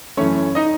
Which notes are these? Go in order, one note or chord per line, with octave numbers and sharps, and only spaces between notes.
F#2 E3 A3 C#4 C#5
D#4 D#5